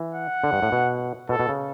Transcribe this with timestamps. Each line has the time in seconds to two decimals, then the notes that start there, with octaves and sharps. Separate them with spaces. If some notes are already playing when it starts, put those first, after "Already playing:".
Already playing: E3
0.15 F#5
0.44 D3
0.53 G2
0.63 A2
0.72 B2
1.29 B2 A4
1.40 B2
1.49 C#3